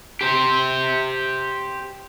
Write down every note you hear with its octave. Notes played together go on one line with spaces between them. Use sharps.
G4 C5